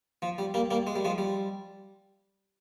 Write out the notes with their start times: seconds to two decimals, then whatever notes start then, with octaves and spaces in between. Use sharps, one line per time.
0.22 F3
0.38 G3
0.54 G3 A#3
0.71 G3 A#3
0.87 G#3
0.96 G3
1.05 F3 G#3
1.18 G3